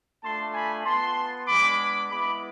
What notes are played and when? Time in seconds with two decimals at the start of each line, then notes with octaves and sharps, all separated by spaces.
0.23 A3 D4 F4 A5 C6
0.54 G#5 B5
0.85 B3 F4 A5 C6
1.47 G#3 B3 D4 B5 D6
2.10 G#3 B3 E4 B5 D6